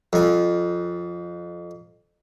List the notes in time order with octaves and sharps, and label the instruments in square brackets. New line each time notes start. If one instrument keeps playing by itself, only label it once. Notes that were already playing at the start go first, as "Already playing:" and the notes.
[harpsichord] F2 G#5